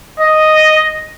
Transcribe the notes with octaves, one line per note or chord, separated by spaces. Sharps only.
D#5